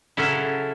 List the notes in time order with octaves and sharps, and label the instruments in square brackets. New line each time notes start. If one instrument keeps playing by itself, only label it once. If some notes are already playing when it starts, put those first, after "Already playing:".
[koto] C#3 F#3 C#4 E4 A4